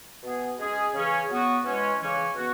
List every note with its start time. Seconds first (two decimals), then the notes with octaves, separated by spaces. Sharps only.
0.23 B2 B3 G#4
0.59 G#3 C#4 G#4
0.94 C#3 E3 C#4 G#4
1.29 F#3 B3 F#4
1.64 E3 G#3 C#4
2.00 C#3 E3 C#4
2.35 B2 B3 F#4